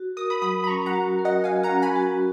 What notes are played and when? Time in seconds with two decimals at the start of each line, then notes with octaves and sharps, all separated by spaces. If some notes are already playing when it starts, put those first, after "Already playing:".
Already playing: F#4
0.17 A#4 D#6
0.30 B5 D#6
0.42 F#3 B5 D#6
0.64 B5
0.67 C#4 A#5 C#6
0.86 F#5 A#5
0.93 F#4
1.19 A#4
1.25 D#5 F#5
1.44 F#3 F5 G#5
1.63 F#5 A#5
1.70 C#4
1.82 G#5 B5
1.96 F#4